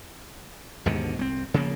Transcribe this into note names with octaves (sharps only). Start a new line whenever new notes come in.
D#2 G#2 B2 D3
C2 G#3 C4
C#3 F3 A3 A#3